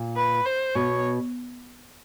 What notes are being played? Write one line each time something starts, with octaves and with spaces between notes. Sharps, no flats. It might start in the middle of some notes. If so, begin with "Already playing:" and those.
Already playing: A#2
B4
C5
B2 C#5